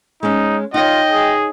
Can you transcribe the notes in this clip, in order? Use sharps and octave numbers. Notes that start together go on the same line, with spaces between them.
G#3 C#4 D#4
D#4 F4 C#5 D#5 G5
G#4